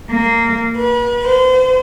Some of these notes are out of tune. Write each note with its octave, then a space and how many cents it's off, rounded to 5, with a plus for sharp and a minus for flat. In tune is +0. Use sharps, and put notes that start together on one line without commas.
A#3 -15
B4 -40
C5 -35